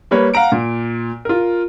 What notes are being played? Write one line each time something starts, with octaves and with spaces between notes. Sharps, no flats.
G3 A#3 B4 C#5
F5 F#5 A#5 D7
A#2
F4 A#4